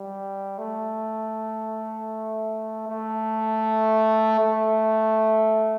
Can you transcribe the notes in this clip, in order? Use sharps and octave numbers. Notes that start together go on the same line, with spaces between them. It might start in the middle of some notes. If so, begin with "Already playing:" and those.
Already playing: G3
A3
A3
A3